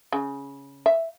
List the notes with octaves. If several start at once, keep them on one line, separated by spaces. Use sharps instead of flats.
C#3
E5